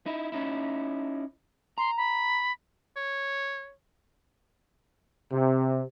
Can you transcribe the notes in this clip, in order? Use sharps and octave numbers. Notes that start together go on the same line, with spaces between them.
D#4 E4
C#4 D#4 E4
A#5 C6
B5
C#5
C3